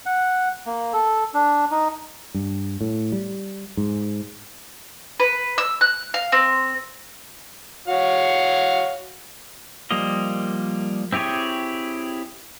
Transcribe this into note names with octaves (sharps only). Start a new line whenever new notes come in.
F#5
A#3
A4
D4
D#4
G2
A2
G3
G#2
B4
E6
F#6
F5
C4
F#4 C#5 F5
F3 G3 A#3 D#5
C4 E4 G4 G#4 C#5